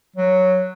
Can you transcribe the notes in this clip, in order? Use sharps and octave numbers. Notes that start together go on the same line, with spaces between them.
F#3